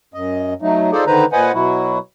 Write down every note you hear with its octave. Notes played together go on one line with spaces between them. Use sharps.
F#2 D#5
F#3 A3 D#4
D#4 F4 G#4 A4 C5 D5
D3 D#3 D#4 B4 C5 A#5
A#2 B4 C5 D#5 F#5 G#5
B2 F#3 E4 F#4